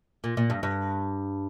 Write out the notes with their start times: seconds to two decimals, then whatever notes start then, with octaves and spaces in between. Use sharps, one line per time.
0.24 A#2
0.37 A#2
0.50 G2
0.63 G2